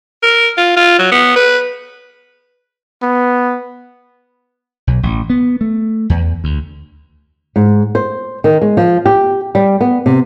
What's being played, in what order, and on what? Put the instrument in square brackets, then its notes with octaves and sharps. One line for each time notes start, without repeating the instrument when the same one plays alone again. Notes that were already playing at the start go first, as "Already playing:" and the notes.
[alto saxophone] A#4
F4
F4
F#3
B3
B4
[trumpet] B3
[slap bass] B1
A1
B3
A3
E2
D2
[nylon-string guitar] G#2
C5
D#3
G#3
F3
G4
G3
B3
C3